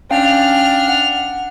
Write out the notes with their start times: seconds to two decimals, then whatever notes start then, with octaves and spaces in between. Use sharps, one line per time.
0.11 C#4 D4 F5 G5 F6
0.88 F#5